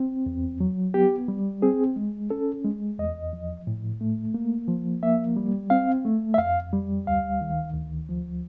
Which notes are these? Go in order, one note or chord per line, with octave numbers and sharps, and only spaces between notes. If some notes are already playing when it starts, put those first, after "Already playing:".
Already playing: C4
E2
F#3
B3 G4
G3
C4 G#4
G#3
C#4 A4
G#3
E2 D#5
F3
A2
A3
A#3
F3
A#3 E5
G3
C4 F5
A3
E5
F2 F5
G3
D2 F5
D#3
D2
F3